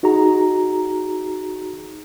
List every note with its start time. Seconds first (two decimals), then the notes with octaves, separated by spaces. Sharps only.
0.03 D#4 F#4 G#4 A#5